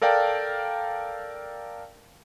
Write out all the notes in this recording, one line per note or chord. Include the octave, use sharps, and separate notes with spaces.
A4 A#4 D5 F5 G5 A5